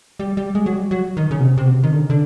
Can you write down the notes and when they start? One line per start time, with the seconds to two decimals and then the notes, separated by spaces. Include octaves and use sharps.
0.20 G3
0.37 G3
0.55 G#3
0.66 F#3
0.72 G3
0.91 F#3
1.17 D#3
1.31 C#3
1.39 B2
1.44 C3
1.58 C3
1.66 B2
1.71 C3
1.83 D#3
1.92 D3
2.01 C#3
2.10 D3